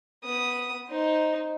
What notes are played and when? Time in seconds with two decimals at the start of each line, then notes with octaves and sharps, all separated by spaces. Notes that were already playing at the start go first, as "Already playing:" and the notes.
0.24 B3 D#6
0.89 D#4 C5